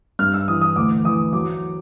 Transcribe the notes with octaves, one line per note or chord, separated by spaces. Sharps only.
G2 F6
E6
E3 D#6
D#6
D2 D6
E3 D#6
F#3 D6